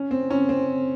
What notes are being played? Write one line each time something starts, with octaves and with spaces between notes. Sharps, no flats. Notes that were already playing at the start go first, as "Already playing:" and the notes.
Already playing: C#4
C4
C#4
C4